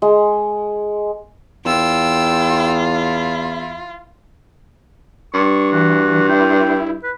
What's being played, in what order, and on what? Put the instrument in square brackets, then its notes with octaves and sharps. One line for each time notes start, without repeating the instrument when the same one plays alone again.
[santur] G#3
[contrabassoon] E2 [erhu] F4 [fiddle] G5 E6
[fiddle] E4
[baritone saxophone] G2 [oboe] C#6
[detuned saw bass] E3 [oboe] F#4
[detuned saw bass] E4 [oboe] G5
[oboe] B4